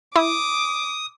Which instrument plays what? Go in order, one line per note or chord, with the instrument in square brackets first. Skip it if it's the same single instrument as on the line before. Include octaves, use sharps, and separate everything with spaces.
[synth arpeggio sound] E4 [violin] D6 [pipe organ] D#6